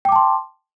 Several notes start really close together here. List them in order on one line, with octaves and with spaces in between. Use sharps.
G5 D6 A5 C6